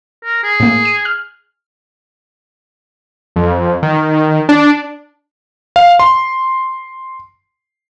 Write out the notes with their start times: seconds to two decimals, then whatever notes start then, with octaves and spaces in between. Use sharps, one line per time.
0.24 A#4
0.43 G#4
0.60 A2 A#3
0.85 D#7
1.05 F6
3.36 F2
3.83 D#3
4.49 D4
5.76 F5
5.99 C6